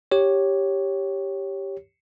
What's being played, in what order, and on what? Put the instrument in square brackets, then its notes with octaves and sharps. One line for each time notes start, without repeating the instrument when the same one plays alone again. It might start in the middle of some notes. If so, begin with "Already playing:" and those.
[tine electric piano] G4 C#5